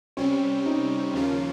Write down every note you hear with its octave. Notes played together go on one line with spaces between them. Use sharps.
C3 G3 C4 C#4
D#4
D#2 C#3 F3 A#3 C#4 F4